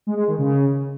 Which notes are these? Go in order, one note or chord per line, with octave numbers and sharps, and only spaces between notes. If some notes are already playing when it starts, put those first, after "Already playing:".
G#3
G#3
D#3
C#3